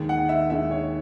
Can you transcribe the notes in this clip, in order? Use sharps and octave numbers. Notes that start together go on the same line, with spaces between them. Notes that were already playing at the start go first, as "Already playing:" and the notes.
Already playing: D#2 D#3 G#3
F#5
E5
D#2 D#3 G#3 E5
C#5